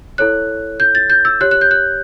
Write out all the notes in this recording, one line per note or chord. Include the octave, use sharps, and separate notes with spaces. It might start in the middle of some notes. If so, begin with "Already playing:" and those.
E4 A4 C#5 F#6
G6
A6
G6
E6
G4 C#5 F#6
F#6
G6
F#6